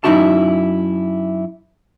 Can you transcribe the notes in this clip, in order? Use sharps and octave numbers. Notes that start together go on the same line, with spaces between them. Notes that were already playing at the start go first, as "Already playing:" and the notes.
F#2 A#3 D#4 E4 F#4 A5